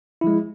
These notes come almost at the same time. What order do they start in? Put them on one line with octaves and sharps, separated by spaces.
E4 F3 G#3